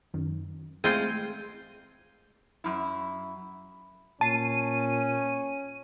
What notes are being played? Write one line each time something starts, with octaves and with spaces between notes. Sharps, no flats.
F#2 D#3
G#3 A3 C4 E4 F4 G#4 C5 G5
F#2 E4
A#2 C#4 A5 C7 D#7